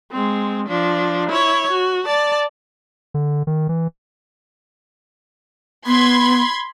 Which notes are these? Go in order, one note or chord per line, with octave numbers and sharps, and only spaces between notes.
G#3 C4
F3 D4
E4 C#5
F#4
D5 A5
D3
D#3
E3
B3 B5 C6 G#6